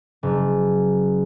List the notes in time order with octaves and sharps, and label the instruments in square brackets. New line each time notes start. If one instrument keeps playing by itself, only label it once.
[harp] F#1